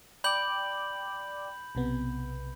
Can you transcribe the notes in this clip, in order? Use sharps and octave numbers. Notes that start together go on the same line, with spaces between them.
D5 G5 B5 D6 G6 F#7
B1 C3 B3